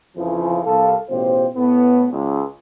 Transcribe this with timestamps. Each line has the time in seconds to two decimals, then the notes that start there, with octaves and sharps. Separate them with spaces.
0.16 F2 C#3 E3 F3
0.64 C2 A4 F5
1.10 A1 B2 F4 G4 C5
1.55 A2 B3
2.11 C#2